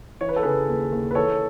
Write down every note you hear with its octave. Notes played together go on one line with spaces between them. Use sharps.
E3 C#5
B4
A4
C#3 G#4 B4
D#2
D#2
B4
E3 A4 C#5